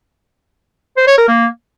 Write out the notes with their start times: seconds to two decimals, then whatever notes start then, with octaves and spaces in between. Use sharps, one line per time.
0.97 C5
1.08 C#5
1.18 A#4
1.28 A#3